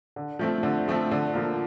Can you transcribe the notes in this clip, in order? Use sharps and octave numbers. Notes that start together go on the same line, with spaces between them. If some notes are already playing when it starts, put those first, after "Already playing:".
D3
F3 A3 C4
D3
F3 A3 C4
D3
F3 A#3 F4